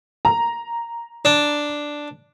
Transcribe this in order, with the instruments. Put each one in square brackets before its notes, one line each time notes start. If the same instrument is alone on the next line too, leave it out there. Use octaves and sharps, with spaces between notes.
[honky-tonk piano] A#5
[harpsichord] D4